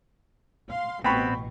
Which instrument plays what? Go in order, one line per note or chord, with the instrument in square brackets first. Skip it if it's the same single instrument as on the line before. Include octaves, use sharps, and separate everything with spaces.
[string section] F5 C6
[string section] A1 B2 [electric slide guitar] B3 C4 [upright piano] G5 B5 C#6